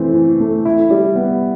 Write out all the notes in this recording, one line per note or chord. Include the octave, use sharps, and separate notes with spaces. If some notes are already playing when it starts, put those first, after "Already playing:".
Already playing: E3 A3 C4
E3
A3
E4
G3
B3